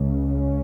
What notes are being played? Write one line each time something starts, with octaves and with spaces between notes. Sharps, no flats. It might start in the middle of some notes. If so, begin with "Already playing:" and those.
Already playing: C#2 C#3
C#4